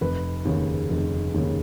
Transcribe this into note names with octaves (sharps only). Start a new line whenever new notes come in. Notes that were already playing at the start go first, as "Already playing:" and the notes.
F1 B4
D#2 C#3
F1
D#2 C#3